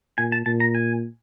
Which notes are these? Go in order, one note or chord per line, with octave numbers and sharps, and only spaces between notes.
A#2 G#5
A5
A#2 A5
A#5
G#5